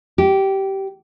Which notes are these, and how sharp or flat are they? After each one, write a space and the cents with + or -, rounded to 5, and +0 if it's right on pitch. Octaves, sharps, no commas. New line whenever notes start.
G4 -15